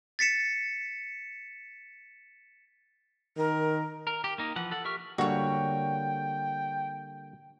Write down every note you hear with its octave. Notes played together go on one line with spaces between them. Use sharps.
A6 B6 C#7 E7
D#3 A#4
A#4
G4
A#3 D#4
E3 F3 F#5
A4 F#5
G4 A#4 E5 C#6 F6
D3 G3 A#3 F#4 C#5 G5